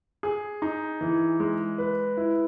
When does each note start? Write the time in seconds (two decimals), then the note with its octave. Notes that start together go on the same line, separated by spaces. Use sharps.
0.23 G#4
0.62 D#4
1.01 E3
1.40 G#3
1.78 B4
2.17 E4